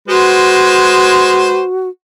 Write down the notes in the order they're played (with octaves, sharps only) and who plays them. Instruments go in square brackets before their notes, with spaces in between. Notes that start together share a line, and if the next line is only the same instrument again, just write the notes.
[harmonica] G#3 B4 C5 [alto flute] F#4